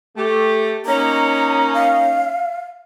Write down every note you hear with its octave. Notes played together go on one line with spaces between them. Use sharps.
A3 G4
A#3 C#4 D#4 A#5
F5